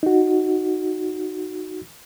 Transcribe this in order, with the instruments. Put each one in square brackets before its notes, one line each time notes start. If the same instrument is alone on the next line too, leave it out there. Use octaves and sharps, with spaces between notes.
[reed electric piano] D#4 F#4